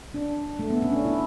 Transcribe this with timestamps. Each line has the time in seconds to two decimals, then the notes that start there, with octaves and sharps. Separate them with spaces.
0.14 D4
0.59 A3
0.70 B3
0.82 C#4
0.93 D4
1.05 E4